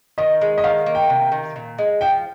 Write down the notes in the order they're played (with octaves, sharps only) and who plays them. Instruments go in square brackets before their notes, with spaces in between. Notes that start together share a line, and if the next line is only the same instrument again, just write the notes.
[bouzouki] D#3 [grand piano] D#5
[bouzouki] G#3
[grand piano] D#5
[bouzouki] D#3 [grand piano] F5
[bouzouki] A#3
[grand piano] G5
[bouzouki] C3
D#3
A#2
G#3
[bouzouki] F3 [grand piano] G5